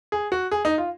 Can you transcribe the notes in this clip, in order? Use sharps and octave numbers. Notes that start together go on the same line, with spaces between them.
G#4
F#4
G#4
D#4
F4